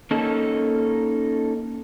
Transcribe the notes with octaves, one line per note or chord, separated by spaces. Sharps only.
A#3 C#4 D#4 A4